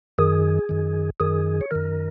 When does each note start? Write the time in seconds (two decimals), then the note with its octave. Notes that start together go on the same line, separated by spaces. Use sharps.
0.18 F#2 D#3 G#4
0.69 F#2 D#3
1.20 F#2 D#3 G#4
1.61 C#5
1.71 F#2 D#3 A#4